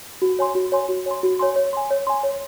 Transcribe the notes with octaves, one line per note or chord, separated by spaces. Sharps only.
F#4
C#5 G#5 C6
F#4
C#5 G#5 C6
F#4
C#5 G#5 C6
F#4
C#5 G#5 C6
C#5
G#5 C6
C#5
G#5 C6
C#5